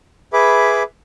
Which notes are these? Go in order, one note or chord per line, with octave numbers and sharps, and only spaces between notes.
G#4 B4 E5 B5 D6